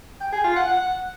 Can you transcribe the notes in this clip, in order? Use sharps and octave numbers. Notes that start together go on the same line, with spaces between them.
G5
G#4
F4
F#5
F#5